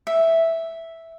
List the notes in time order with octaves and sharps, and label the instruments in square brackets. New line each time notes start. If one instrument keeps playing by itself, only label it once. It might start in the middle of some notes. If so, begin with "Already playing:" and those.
[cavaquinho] E5